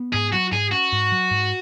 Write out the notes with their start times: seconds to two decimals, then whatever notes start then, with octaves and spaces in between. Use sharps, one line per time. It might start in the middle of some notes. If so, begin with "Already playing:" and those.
Already playing: B3
0.13 G#2 G#4
0.33 F#3 F#4
0.52 G#2 G#4
0.72 C#4 F#4
0.92 G#2
1.12 F#3
1.31 G#2